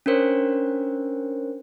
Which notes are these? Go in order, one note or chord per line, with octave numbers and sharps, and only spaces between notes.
C#4 D4 A#4 C5 C#5